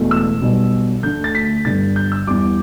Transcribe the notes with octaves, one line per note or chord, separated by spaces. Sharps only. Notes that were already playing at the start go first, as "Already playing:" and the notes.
Already playing: E1 E2 B2 A3
E6
B1 B2 G3
D2 D3 A3 G6
A6
B6
G1 G2 G3 A6
G6
E6
E2 E3 G3 D6